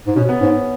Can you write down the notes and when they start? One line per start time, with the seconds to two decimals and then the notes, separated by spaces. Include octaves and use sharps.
0.07 G#2
0.16 B2 C#4
0.29 B3
0.41 G#2 C#4